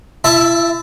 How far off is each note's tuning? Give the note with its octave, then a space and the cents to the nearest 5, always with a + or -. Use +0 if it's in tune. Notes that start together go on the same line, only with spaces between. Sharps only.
E4 +40 E5 +0 A5 +0